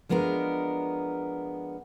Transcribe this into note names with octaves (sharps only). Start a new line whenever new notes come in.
F3 G#3 B3 D4 A#4